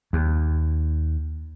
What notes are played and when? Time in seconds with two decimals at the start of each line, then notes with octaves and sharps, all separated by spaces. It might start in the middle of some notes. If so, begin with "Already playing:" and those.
0.13 D#2